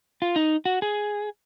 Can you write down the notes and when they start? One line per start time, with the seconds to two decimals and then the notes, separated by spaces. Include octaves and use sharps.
0.22 F4
0.36 D#4
0.65 F#4
0.82 G#4